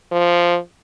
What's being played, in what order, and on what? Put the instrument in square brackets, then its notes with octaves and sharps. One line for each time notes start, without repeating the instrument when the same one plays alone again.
[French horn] F3